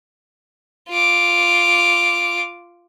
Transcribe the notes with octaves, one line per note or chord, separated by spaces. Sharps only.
F4 D6